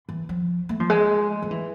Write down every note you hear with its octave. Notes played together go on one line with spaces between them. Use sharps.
E3
F3
A3
F3
G#3
F3
E3